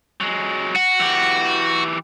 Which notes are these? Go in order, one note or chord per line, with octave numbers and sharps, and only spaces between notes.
F#3 G#3
F#4
E3 G4